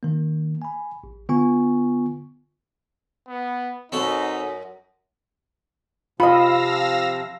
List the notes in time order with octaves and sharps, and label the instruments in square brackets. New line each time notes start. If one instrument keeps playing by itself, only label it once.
[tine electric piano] D#3 A#3
G#5 B5
A1
D3 B3 F4 G#5 C#6
[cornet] B3
[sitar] F#2 [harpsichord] C4 F#4 A4 [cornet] D#4
[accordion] C3 F3 [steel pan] F4 D#5 [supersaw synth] F5 E6 A#6 [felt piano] B5